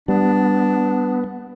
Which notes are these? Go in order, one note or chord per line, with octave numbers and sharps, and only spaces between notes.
G3 B3 D4